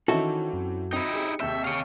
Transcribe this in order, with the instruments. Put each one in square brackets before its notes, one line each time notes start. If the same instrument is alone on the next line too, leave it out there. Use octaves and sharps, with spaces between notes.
[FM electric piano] D#3 D#4 E4 [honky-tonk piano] E3 C4 C#4 [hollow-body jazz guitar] F#4 A4
[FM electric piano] F#2
[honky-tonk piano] C4 [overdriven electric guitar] D#4 E4
[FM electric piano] G4 G#4 C#7
[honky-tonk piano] D#2 C3 G6 [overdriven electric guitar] E5
[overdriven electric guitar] C#5 F5